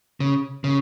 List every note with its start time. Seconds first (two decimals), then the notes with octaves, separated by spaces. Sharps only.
0.20 C#3
0.64 C#3